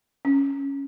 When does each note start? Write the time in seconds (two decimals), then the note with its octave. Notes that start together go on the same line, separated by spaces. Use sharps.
0.25 C#4